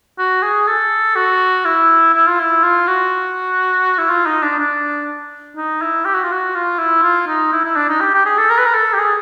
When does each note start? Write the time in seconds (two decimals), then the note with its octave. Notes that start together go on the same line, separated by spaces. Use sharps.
0.18 F#4
0.43 G#4
0.68 A4
1.16 F#4
1.65 E4
2.14 E4
2.27 F4
2.40 E4
2.63 F4
2.87 F#4
3.98 E4
4.10 F4
4.26 D#4
4.42 D4
4.58 D4
5.57 D#4
5.81 E4
6.05 G4
6.14 F#4
6.23 F4
6.32 F#4
6.55 F4
6.79 E4
7.03 F4
7.28 D#4
7.53 E4
7.65 E4
7.76 D4
7.89 D#4
8.00 G4
8.14 G4
8.26 G#4
8.38 A4
8.50 A#4
8.58 B4
8.66 A#4
8.74 A4
8.94 G4
8.99 G#4